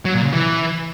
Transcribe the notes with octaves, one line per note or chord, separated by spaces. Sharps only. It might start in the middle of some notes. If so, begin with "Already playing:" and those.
F#3
A#2
C#3
E3